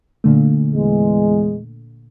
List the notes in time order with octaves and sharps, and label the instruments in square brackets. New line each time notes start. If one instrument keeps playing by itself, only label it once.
[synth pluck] A#2 D3 A3
[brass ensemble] E2 G#3